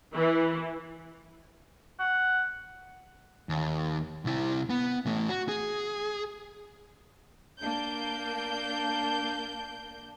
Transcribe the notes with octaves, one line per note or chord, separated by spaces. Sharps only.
E3
F#5
D#2
C2 E4
B3
E3 A3
F#4
G#4
A#3 D4 G6